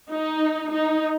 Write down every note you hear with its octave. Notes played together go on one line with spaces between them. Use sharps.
D#4
D#4